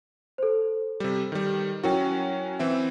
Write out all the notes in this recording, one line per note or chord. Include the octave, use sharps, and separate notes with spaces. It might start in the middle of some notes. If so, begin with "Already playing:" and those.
A4 C5
C3 G3
D#3 G3
F#3 C#4 E4 F#4 A#4 G5
E3 C4 E5